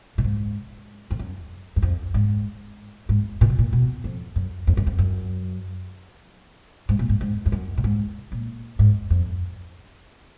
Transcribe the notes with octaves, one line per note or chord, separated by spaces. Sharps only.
A#2
G#2
F2
F#2
F#2
F2
G#2
G#2
A#2
B2
A#2
B2
F2
F#2
F2
F#2
F2
F#2
G#2
A#2
G#2
G#2
F2
F#2
A#2
G#2
A#2
G#2
F2